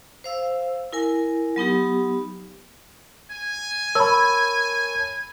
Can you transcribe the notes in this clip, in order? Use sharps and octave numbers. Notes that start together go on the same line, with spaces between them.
C5 F5 E6
E4 A#4 G#5
F#3 B3 D#4 G4
G#5
A#4 C#5 A5 B5 E6